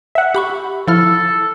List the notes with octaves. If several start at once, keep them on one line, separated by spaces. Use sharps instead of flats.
E5 F#5
G4 B5 C#6
F3 E4 A4 F6